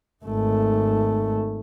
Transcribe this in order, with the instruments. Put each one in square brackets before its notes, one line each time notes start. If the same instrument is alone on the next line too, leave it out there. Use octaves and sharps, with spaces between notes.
[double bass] G#1 A3